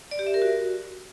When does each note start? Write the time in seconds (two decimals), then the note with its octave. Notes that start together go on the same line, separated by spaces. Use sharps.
0.11 D5
0.19 G4
0.27 E5
0.34 A#4
0.42 F#4